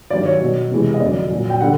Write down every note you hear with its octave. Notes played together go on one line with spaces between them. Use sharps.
G2 D#3 F#3 D5
C#5
B2 F#3
E2 C3 E3 G#3
D#5
F2 D3 F#3 D5
A#2 F#3
G5
D3 G3 F#5